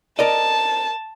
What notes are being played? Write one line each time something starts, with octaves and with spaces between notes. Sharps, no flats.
A#4 D5 D#5 A5